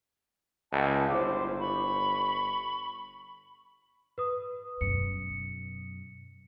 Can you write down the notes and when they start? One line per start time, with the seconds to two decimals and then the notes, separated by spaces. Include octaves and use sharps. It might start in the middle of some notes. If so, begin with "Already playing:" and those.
0.73 C#2 E5 F#5 A5
1.10 G1 E4 C5 D6
1.59 B5 C#6
4.18 B4 D#6
4.81 F#2 B2 C#7